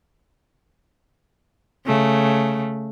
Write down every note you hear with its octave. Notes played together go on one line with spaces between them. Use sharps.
C#3 A3